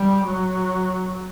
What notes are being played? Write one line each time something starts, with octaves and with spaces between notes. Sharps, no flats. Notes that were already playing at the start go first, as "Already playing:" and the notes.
Already playing: G3
F#3